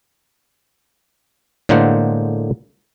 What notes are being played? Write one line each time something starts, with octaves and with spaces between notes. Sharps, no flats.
A2 D3 G#3 A#3 C5 F#5